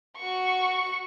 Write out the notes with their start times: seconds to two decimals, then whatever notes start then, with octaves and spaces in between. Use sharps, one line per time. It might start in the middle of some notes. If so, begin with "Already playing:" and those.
0.17 F#4 C#6